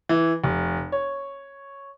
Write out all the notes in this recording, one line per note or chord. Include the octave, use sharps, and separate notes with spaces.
E3
F1
C#5